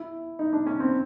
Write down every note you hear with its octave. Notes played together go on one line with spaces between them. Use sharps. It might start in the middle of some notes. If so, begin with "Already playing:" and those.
Already playing: E4
D#4
D4
C#4
C4